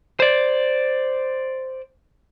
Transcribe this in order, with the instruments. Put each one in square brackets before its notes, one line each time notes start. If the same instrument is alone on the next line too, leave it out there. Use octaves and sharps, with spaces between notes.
[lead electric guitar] C5 D5